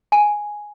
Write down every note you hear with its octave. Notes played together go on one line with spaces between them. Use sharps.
G#5